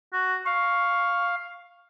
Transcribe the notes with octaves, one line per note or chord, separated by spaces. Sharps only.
F#4
F5 C#6